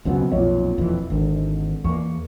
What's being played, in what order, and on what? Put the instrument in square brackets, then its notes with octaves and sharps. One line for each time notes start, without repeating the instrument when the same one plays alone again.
[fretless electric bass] C#2 F#2 B2 [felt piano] F#3 B3 C4
[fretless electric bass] B1 F2 [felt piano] A#2 C#5
[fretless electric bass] E1 F2 E3
[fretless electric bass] G#1 [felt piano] D3
[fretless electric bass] E2 A#3 [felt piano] C#6